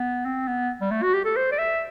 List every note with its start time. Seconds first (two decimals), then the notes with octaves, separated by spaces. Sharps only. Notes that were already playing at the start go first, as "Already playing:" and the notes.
Already playing: B3
0.25 C4
0.47 B3
0.81 G3
0.91 A3
1.03 F#4
1.14 G4
1.25 A4
1.36 C5
1.52 D5
1.59 E5